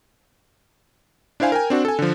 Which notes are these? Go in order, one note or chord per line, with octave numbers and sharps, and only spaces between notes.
D4 E4 C5 F5 G#5
A#4 G5 G#5
C4 D4 F#4
A4 G#5
D3 F3